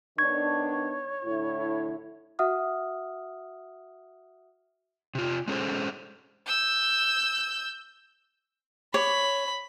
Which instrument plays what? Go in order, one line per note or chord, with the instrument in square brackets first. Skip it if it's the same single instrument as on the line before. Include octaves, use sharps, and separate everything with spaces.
[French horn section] D#3 B3 D4 [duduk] C#5 [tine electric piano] C#6 G#6
[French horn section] A2 D3 E4
[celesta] F#4 E5 F#5 D#6 F6
[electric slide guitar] C3 F4
G#3 C#4 G#4 A4 C5
[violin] E6 G6
[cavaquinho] C#5 [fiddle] B5